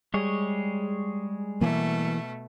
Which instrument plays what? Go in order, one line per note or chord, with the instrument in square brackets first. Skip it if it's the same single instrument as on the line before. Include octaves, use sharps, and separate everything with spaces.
[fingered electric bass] G3 [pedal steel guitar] G#3 G#4 C#5
[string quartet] B2 A3 [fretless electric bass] E3 A#3